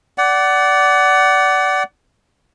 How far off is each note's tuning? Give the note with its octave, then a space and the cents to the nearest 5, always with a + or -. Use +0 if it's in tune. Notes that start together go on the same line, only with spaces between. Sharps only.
D5 -15 F#5 +25